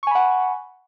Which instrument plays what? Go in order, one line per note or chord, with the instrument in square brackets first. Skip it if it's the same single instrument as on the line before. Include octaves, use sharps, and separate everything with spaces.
[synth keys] C#6
G#5
B5
F#5